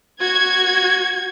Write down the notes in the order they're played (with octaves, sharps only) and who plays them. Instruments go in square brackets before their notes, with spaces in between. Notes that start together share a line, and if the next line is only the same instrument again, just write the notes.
[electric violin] F#4 [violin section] G#6